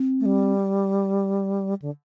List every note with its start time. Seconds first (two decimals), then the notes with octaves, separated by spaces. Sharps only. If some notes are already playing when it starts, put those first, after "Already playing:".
Already playing: C4
0.20 A3
0.25 G3
1.82 D3